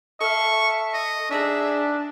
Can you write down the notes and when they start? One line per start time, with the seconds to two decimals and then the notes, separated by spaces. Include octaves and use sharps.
0.21 A4 E5 F5 C#6
0.93 D#5
1.31 D4 D#4 G4 G#4 E5